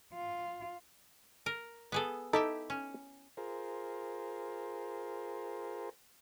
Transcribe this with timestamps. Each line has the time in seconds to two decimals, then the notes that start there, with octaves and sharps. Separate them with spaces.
0.14 F4
1.46 A#4
1.92 B3 G#4 A4
2.33 D#4 E4 G4 A4 E5
2.70 C#4
3.37 F4 G#4 A#4 C5